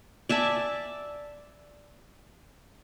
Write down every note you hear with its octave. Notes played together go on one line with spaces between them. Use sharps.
D5 E5 G#5 A5